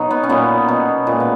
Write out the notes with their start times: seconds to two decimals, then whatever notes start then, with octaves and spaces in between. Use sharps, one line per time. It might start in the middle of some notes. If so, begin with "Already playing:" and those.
Already playing: B2 F#3 D#4 C#5
0.10 B3
0.23 C#4
0.29 A#2 F#3 B3
0.68 B2 F#3
1.07 A#2 G#3 B3
1.20 B3